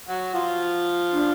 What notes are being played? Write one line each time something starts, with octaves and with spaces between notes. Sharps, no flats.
F#3 F#4
F3 F4
D4